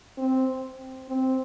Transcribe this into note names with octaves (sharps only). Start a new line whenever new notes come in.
C4
C4